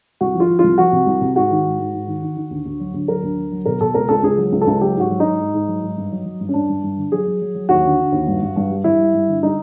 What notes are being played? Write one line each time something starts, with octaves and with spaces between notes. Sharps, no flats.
C2 F#4
F3
F4
F3
C2 F4
F3 F#4
C3
C2
C3
G#2 F#4
D#3
G#2
G#2
G#2
D#3
D#3
D#3
D2
D2
F#3
D2
F#3 A#4
D2
D3
F#3
B2 A#4
B2 A4
C#2 A#4
C#2 A4
C#2 G#4
F#3
C#2
A4
C#2
F#3 G4
G#2 F#4
F#3
D#4
G#2
G#2
G#2
F#3
G#2
G2
F#3
F#3
G2
C#4
G2 D4
G2
G2
D3
F#3 G#4
F#3
F#3
F#3
D#2 F#4
D3
D3
D#2
G2
G2
G2
G3
G2 E4
G3
G2
D3
G3 D#4